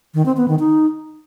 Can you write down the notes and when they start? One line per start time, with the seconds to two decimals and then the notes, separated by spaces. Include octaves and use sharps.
0.14 D#3
0.26 C4
0.37 B3
0.48 D#3
0.59 D#4